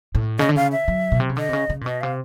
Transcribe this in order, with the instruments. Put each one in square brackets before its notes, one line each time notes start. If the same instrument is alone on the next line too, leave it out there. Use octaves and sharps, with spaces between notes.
[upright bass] A2
[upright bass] C#3 [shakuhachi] D#5
[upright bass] D3
[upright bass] C#3 [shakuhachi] F5
[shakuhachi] E5
[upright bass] F#3
B2
C3
C#3
[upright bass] D3 [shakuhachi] D#5
[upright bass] C3
C#3
C#3
A#2
[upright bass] B2 [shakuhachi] D#5
[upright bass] C3 [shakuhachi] F5